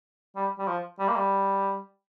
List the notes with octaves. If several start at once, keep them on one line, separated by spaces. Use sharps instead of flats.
G3
G3
F3
G3
A#3
G3